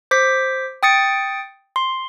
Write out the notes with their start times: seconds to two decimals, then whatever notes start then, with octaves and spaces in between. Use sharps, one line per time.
0.11 C5 D6 B6
0.83 G5 D#6 A6 C#7
1.76 C6